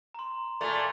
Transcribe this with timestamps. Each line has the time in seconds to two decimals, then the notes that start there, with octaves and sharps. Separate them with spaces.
0.14 A#5 C6
0.61 A#2 A3 C6 A6 F7